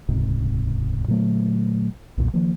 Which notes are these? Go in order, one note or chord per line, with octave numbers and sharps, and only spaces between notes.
D#1 C#2 G#2 C3
A#2 D3 F#3 A3
B1 E2 A#2
D#3 F3 A#3